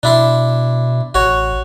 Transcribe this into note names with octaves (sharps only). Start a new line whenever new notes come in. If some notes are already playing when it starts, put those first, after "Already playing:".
B2 D4 E4 C6
A1 F#4 C#5